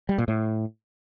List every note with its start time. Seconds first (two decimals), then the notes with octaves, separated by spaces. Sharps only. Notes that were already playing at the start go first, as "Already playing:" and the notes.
0.09 G3
0.18 A#2
0.28 A2